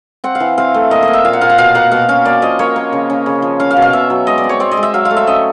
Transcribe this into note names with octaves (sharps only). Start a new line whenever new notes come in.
C4 F#5
F5
E3
C4 F5
A3
A#3 D#5
D#5
A#3
E5
A#2 F5
F#5
A#2 F5
F#5
B2 F5
A#3 F#5
B2 F5
C#4 F5
A#3 D5
F3 D#5
A#3 C#5
A#3
C#3
C#4
C#3
F3
C#4 F5
F5
B2
F5
B2 E5
F#3
G#3 D#5
D5
C4
C#5
C4 D5
D#5
G#3
E5
F#3 F5
F5
A3
E5
C#4 D#5